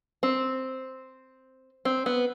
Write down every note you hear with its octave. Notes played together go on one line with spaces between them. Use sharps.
C4
C4
B3